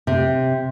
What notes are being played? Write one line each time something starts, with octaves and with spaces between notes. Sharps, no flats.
C3